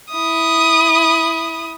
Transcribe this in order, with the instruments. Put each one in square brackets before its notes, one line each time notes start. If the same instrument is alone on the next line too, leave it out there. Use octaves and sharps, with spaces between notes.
[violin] E4 D#6